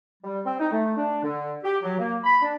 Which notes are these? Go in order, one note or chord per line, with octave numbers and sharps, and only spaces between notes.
G3
C4
D#4
A3
D4
D3
G4
F#3
A#3
B5
D4